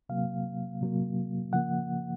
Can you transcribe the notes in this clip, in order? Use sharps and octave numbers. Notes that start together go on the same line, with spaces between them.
C3 F#3 A#3 F5
C3 F#3 A#3
C#3 F3 A#3 F#5